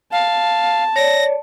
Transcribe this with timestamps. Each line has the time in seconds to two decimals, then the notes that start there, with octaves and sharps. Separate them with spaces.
0.12 F5 A5
0.96 C#5 D5 A#6